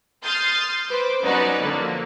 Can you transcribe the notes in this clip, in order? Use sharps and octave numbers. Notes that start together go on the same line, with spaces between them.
C6 D#6 F6 G6 A6 C7
B4 C5 D6
F#3 B3 C#4 D#4 B4 D5
D3 F3 F#3 A#3